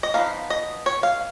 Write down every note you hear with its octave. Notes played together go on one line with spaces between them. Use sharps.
D#5
F3 B3 D#4 F5
D#5
C#5
F5